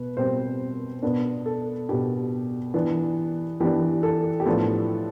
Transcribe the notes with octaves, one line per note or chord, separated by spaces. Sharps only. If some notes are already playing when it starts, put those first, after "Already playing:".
Already playing: B2 B4
B2 G3 C4 C5
B2 B3 D4
A4
B2 B3 D4 G4
E3 B3 D4
E3 B3 D4 G4
A4
G4
A2 F3 B3 D4 A4